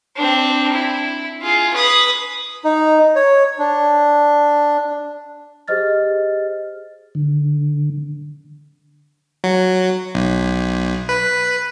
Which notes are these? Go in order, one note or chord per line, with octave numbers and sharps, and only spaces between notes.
C4 D4
E4
F4 G#4
B4 D#6
D#4
C#5
D4
G4 G#4 C5 D#5 F6 A6
D3
F#3
B1
B4